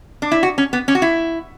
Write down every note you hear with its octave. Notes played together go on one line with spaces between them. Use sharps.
D4
E4
F#4
C#4
B3
C#4
F#4
E4